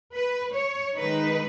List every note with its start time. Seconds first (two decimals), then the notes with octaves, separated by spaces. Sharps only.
0.15 B4
0.55 C#5
0.95 D#3 G#3 D#4 B4